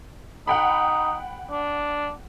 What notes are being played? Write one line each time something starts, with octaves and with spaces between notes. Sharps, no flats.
D#4 F#5 G5 B5
D4